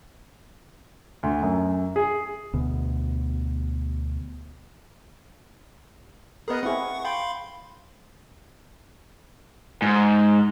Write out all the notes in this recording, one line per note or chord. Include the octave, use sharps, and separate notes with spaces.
D2
F#2
G#4
D2 B2
B3 G#4 A#4 B4 D#5
C4 E4 G#4 F#5 C#6
F5 G5 B5 C6
G#2